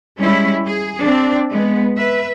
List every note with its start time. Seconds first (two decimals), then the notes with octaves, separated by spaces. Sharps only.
0.18 G3 G#3 C#4 E4
0.65 G#4
1.01 C4 D4
1.51 G#3 B3
1.96 B4 E5